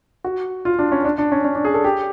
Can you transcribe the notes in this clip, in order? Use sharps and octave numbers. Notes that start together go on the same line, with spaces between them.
F#4
F4
D4
C#4
D4
D4
C#4
C#4
D4
G#4
A4
G4